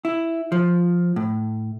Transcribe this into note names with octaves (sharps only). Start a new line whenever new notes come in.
E4
F3
A2